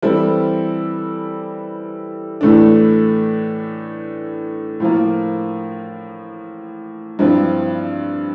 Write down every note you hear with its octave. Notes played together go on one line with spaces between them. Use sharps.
E3 G3 C4 E4 A4
A2 E3 A3 D4
A2 F3 A#3
G2 F3 C4 E4